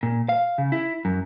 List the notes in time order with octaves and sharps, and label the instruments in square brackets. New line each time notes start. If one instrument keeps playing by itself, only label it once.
[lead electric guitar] A#2
F5
C#3
E4
F#2